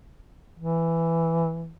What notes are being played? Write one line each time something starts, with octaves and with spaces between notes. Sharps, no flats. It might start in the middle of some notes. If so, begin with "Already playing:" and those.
E3